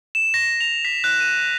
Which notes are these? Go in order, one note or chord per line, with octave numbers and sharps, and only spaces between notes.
E7
A#6
F7
B6
F#6
D#7